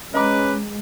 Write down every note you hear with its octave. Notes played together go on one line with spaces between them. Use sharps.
G#3 C#4 B4 D#5 A#5 D6